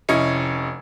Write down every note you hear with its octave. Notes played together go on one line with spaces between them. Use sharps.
F1 C#4 E4 D#5 G#6 C#7